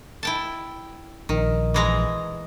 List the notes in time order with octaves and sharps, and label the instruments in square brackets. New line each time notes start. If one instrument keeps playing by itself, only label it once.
[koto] E4 G5 A5
[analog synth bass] A#1 [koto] D#3
[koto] E3 G#3 A#5